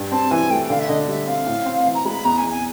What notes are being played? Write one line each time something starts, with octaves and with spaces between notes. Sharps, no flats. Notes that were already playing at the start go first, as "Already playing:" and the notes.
Already playing: G2
C4 A5
E3 G#5
A3 G5
D3 F5
E5
D3 D#5
G3 E5
C4 F5
A2
C4
E3
A#5
G#3 B5
E2 A#5
G#5
E2
G#5